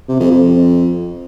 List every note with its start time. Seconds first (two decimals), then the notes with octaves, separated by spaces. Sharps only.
0.08 C3
0.20 F2
0.31 F2